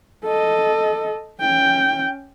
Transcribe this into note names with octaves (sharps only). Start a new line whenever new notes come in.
A4 D#5
C#4 G5